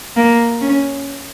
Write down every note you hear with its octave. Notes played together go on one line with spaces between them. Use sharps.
A#3
C#4